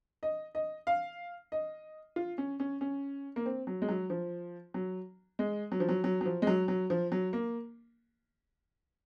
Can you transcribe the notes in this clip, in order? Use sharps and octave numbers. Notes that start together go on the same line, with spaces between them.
D#5
D#5
F5
D#5
F4
C#4
C#4
C#4
A#3
C4
F#3
G#3
F#3
F3
F#3
G#3
F#3
F3
F#3
F#3
F#3
F3
G#3
F#3
F#3
F3
F#3
A#3